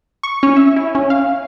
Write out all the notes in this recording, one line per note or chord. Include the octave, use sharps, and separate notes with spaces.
C#6
C#4
E5
E4
C#4
F5